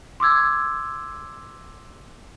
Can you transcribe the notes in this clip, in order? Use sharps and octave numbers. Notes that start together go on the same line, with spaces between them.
C6 D6 E6 G#6